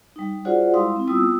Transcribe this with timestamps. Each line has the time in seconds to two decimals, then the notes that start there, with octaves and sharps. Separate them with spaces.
0.16 G3 D#4
0.45 F4 F#4 G#4 C5 D5 F#5
0.74 G3 G#3 E4 F5 C6 D#6
0.96 C4 E4
1.07 G3 B3 F4 D#6 E6